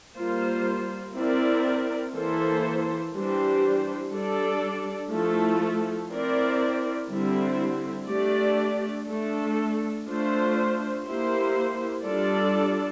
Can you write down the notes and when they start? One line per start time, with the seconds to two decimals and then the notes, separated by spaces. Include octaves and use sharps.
0.16 G3 A#3 F4 C5
1.15 C4 E4 A#4 D5
2.14 E3 A#3 E4 A4 C5
3.13 E3 G3 D4 G4 C5
4.11 G3 D4 A4 D5
5.10 F3 A3 E4 A4
6.10 C4 E4 A#4 D5
7.09 D3 G3 C4 E4
8.07 A3 D4 G4 D5
9.07 A3 D4 A4
10.06 A3 D4 F4 C5
11.05 A#3 E4 G4 C5
12.04 G3 D4 F4 A4 D5